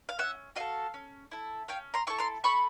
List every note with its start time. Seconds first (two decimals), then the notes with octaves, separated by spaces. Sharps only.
0.09 F5
0.19 C#4 E5 F#5
0.56 F#4 A4 D#5 F5
0.94 C#4
1.31 E4 A4
1.68 C#4 F5 G5
1.94 A#5 C6
2.07 E4 A4 C#6
2.18 A#5 C6
2.44 A3 B5 C#6